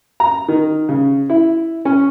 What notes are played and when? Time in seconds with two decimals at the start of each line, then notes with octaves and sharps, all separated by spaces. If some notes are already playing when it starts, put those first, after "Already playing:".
0.20 A#5
0.48 D#3
0.89 C#3
1.30 E4
1.85 C#4